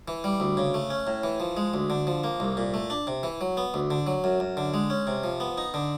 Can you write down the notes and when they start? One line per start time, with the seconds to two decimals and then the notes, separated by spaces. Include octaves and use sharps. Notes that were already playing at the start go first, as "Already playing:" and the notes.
0.08 E3
0.24 G3
0.40 D2
0.57 C#3
0.74 A3
0.90 C#4
1.07 A2
1.23 E3
1.40 F3
1.57 G#3
1.74 D2
1.90 D3
2.07 F3
2.24 A#3
2.40 C2
2.57 A#2
2.74 A3
2.90 D4
3.07 C3
3.23 E3
3.41 F#3
3.57 B3
3.74 D2
3.91 D3
4.07 F#3
4.24 F#2
4.40 F#2
4.57 D3
4.74 G#3
4.90 C#4
5.07 C3
5.24 F3
5.40 B3
5.58 D#4
5.74 D3